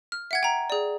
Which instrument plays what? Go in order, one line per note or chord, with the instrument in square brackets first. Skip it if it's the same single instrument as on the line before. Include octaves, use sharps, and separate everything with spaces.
[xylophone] F6
E5 F#5 G#6
G5 A#5
G#4 D5